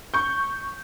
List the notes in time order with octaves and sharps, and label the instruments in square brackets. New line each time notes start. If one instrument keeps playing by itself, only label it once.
[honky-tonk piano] C#6 G6